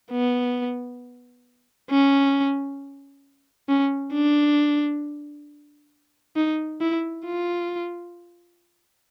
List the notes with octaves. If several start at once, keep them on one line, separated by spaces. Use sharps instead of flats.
B3
C#4
C#4
D4
D#4
E4
F4